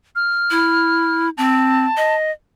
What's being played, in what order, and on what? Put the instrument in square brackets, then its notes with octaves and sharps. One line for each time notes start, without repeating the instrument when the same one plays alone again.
[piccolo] F6
[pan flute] E4
[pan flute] C4 [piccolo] A5
[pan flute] D#5